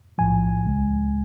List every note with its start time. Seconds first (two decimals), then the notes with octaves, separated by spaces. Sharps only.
0.18 B1 A2 F3 G#5
0.66 C#2 C#3 G#3